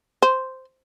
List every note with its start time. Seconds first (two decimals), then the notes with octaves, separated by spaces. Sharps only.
0.22 C5